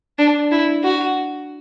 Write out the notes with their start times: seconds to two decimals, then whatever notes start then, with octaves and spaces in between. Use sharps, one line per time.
0.18 D4
0.51 E4
0.84 F#4